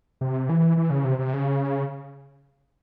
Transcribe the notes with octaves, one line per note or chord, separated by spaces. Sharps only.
C3
E3
E3
C#3
C3
C3
C#3